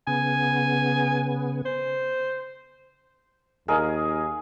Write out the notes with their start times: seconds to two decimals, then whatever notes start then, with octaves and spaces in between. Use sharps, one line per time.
0.07 C#3 B3 G#5
1.66 C5
3.68 D#2 G#4 A#4 D#5 F5